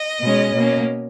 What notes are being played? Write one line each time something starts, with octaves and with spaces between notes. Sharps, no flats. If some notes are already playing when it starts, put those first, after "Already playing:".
Already playing: D#5
B2 G#3 C#4
B2 A#3 C#4